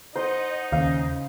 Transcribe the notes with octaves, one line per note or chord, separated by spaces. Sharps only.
D#4 C5 D#5 F#5
D#2 C#3 F5